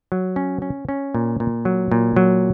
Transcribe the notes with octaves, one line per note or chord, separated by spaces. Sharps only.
F#3
C#4
C#4
C#4
A#2
A#2
F#3
A#2
F#3